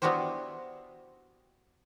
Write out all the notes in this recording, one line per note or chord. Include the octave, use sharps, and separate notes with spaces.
B3 D4 E4 F#4 G4 C5